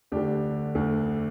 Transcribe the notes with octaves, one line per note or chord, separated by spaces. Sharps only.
D2 D3 D4 G4
D2 D3